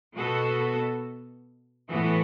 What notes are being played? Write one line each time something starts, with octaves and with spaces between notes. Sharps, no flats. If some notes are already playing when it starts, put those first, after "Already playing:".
B2 B3 F#4 A4
A2 E3 B3 F#4 A4